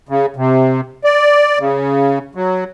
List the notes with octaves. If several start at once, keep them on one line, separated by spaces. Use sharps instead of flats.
C#3
C3
D5
C#3
F#3